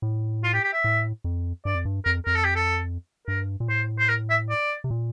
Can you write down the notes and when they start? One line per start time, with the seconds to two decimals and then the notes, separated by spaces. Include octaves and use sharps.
0.02 A2
0.44 F4
0.54 G4
0.64 G4
0.73 E5
0.84 A2
1.24 F2
1.65 G2 D5
1.75 F2
1.85 G2
2.05 F2 A#4
2.26 F2 A#4
2.36 A4
2.45 G4
2.55 A4
3.27 G2 A#4
3.60 A#2
3.69 A2 C5
3.99 C5
4.09 A#4
4.30 E5
4.50 D5
4.84 C3
4.91 A#2